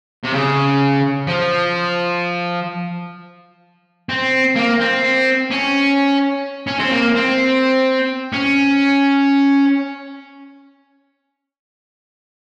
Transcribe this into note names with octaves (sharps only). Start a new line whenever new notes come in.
C3
C#3
F3
C4
A#3
C4
C#4
C#4
C4
A#3
C4
C#4